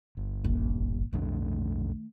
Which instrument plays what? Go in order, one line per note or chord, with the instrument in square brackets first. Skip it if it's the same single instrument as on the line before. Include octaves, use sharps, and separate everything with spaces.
[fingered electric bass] G1
[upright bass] D#1 A1
[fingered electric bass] B1 F2 D4 [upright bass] D#3 A3